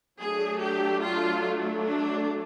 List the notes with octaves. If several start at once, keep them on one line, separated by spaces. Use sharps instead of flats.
F#3 A3 D4 G#4
G4
F4
D4